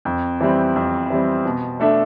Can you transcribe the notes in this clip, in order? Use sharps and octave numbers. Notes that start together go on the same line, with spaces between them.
F2
E3 G3 C4
F2
E3 G3 C4
B2
A3 D4 A4 E5